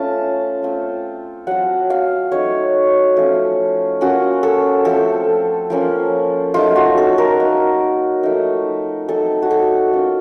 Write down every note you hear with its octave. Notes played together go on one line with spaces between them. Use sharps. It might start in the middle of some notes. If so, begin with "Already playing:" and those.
Already playing: A3 C#4 F4 A5
A3 C4 F4
F#3 C4 F4 F#5
F5
F#3 A3 D#4 C#5
F3 A3 C#4 F4
A#3 C#4 F4 F#4
A4
F3 A3 C4 A4
F3 A#3 C#4 F4
F#3 A3 D#4 F4
F#4
A4
A#4
A#3 D#4
F3 A3 D#4
F#3 C4 D#4 A4
F#4
A4
A#3 C#4 F4